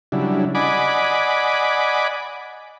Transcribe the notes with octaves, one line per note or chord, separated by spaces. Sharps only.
C#3 F#3 G3 D4 E4
D5 D#5 F#5 G#5 B5 D6